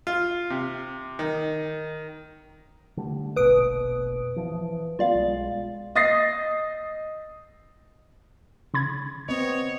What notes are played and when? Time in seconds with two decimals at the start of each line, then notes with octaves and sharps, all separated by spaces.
0.07 F4
0.50 C3
1.19 D#3
2.97 D3 G3 A3
3.36 F1 A#1 B2 B4 D#6 D7
4.36 E3 F3
4.99 G3 A#3 B3 F4 D5 F5
5.13 B1 G#3
5.95 D#5 D#6 A6 A#6 C7
8.74 C#3 B5 G#6
9.29 B3 C4 C#5 D#5